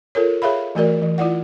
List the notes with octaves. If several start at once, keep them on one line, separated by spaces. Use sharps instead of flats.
F4 A4 A#4 C#5
G#4 C#5 E5 F5 B5
E3 A3 F#4 A#4 D5
E3
E4 F4 D5 F#5